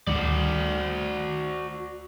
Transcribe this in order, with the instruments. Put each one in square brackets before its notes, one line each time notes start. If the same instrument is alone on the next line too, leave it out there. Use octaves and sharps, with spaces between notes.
[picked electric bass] D2 D#3 G3 [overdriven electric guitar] F#4 D5